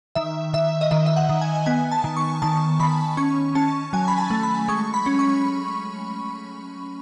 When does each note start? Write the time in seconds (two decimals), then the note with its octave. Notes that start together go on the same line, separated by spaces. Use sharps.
0.15 D#3 E5
0.53 D#3 E5
0.81 D#5
0.91 D#3 E5
1.06 E5
1.16 F#5
1.29 D#3
1.41 G#5
1.66 B3 G#5
1.91 A5
2.04 D#3
2.17 C#6
2.42 D#3 A5
2.80 D#3 B5
3.17 C#4 C#6
3.55 C#4 A5
3.93 F#3 G#5
4.08 B5
4.18 A5
4.30 A3
4.43 B5
4.68 G#3 C#6
4.94 B5
5.06 C#4
5.19 C#6